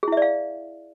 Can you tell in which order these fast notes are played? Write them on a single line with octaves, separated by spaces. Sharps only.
G#4 E4 E5 D5 F5